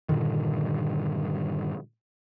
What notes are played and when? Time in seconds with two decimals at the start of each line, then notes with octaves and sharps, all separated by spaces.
0.09 G2 A#2 D3 D#3